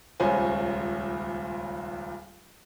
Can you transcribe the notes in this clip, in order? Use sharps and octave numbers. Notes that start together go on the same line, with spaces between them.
D#1 C#2 C#4 C5 G#5